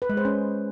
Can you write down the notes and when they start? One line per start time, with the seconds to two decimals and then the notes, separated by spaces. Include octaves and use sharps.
0.02 B4
0.09 G#3
0.17 C5
0.25 C#4